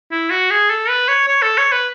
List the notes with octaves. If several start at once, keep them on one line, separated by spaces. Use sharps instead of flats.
E4
F#4
G#4
A4
B4
C#5
C#5
A4
C#5
B4